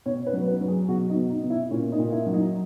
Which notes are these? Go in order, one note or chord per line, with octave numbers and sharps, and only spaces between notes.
B2 C#5
B4
F#3
B4
F#3
G#4
B2 F#4
D#4
B2
D#4
B2
E4
A#2 C#4
D#4
A#2
E4
F#3
D#4